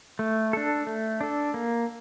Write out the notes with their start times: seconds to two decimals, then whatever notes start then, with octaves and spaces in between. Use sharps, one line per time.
0.19 A3
0.53 D4 A4
0.87 A3
1.21 D4 A4
1.54 A#3